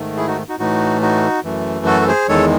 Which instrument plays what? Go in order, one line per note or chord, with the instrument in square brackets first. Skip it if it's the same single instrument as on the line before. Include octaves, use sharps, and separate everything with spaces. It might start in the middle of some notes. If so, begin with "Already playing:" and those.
Already playing: [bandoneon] G#2 D#3 A3
E4 G#4
D#4 F#4
D#4 F#4
A2 E3 A3 D#4 F#4
D#4 F#4
F#2 E3 A3
F#4 A4
A4
G#4 C5
E2 D#3 G#3 A4 C#5